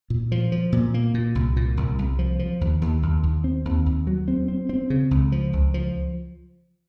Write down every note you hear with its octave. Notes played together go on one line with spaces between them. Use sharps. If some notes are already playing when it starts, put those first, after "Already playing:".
A#2
F3
F3
A#2
A#3
A#2
C2
A#2
C2
C2
F3
F3
D#2
D#2
D#2
D#2
C4
D#2
D#2
F#3
C4
C4
C4
C#3
C#2
F3
C#2
F3